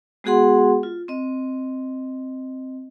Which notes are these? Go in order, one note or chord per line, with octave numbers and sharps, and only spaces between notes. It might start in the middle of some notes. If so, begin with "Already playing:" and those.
G#3 B3 F#4 G#4 F#5 C6
F4
C4 D#5